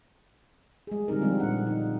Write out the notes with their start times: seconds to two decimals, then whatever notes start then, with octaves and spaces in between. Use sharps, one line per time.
0.87 G#3 G#4
1.08 D3 G3 C4 D#4 A#4
1.21 F3 G3 G#3 C4 D4 F4
1.40 A#2 F#5
1.67 D#4